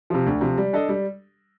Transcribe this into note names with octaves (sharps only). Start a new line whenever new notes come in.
C3 F3
D2
C3 F3
G3
D4 A4 D#5
G3